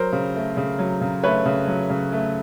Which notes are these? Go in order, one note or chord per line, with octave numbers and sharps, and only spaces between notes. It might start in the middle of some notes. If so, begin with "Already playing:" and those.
Already playing: F#3 A#4 C5
C#3
A3
C#3
F#3
C#3
A3 B4 C#5
C#3
F#3
C#3
A3